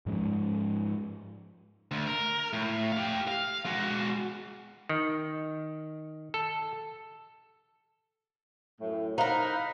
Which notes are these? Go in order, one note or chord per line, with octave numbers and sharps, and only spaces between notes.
G#2 F3 G#3 C#4
D2
A#4
A2
G4 F5
F5
G#3 F#4
D#3
A4
F#2 A2
D#4 A#4 C5 F5 F#5 B5